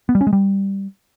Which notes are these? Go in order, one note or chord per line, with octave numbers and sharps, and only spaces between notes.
B3
G3
C#4
G#3
G3